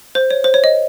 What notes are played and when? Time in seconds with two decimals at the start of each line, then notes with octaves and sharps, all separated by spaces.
0.15 C5
0.31 C#5
0.44 C5
0.54 C#5
0.64 D#5